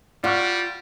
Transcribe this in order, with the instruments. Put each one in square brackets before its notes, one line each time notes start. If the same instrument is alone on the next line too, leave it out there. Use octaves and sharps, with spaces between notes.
[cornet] G3 [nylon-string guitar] F4 [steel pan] D5 F#5 C#6